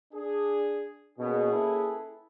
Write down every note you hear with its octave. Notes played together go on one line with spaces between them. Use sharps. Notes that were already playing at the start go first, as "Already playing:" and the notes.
D4 G#4
B2 A#3 C#4 G#4
E4 A4 B4